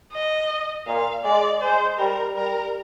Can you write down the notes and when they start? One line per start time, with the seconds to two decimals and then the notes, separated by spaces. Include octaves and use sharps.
0.13 D#5
0.87 A#2 F5
1.24 G#3 D5
1.61 G#3 C5
1.98 G3 A#4
2.36 G3 A#4